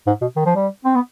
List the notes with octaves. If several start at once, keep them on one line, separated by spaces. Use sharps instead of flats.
G#2
B2
D#3
F3
G3
C4
B3